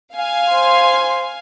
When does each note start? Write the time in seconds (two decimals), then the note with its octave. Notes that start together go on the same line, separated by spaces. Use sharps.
0.14 F5 G#5
0.51 C5 C6